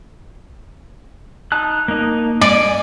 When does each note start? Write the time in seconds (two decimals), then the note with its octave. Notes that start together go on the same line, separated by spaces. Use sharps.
1.52 D#4 A5 F#6
1.88 A#3 D#4
2.41 D5 G#5